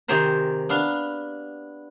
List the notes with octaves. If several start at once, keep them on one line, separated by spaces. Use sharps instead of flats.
C3 D#3 G4 G#4 C5 A#5
B3 D4 F5